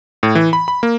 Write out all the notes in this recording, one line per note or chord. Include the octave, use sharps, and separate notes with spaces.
A2
E3
B5
B5
A#3